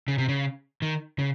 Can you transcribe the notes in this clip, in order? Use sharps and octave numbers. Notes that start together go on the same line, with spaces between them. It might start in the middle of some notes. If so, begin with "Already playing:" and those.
C#3
C3
C#3
D#3
C#3